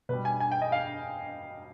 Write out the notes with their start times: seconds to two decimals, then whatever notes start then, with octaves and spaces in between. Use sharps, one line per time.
0.09 B2 G3 B4
0.25 G#5
0.40 G#5
0.52 G5
0.62 D#5
0.72 F5